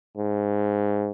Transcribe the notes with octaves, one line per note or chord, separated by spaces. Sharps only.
G#2